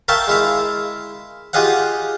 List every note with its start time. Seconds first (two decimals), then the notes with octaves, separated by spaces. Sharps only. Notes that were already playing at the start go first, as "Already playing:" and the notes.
0.08 A#4 E5 F5 G5 A5 C#6
0.28 G#3 E4 F5
1.53 F4 G4 G#4 D#5 F5 F#5